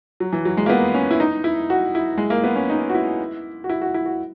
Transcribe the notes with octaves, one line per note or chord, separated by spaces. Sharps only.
F#3
E3
F#3
G#3
A#3
B3
C#4
E4
D#4
E4
F#4
E4
G#3
A#3
B3
C#4
D#4
F#4
E4
F#4
E4
F#4
E4
F#4